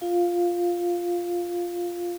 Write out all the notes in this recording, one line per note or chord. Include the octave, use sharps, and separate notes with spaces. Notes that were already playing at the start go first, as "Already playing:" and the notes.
F4 F5